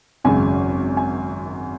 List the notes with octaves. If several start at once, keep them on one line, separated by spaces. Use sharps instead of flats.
G#1 F#2 C#3 G#5
G#5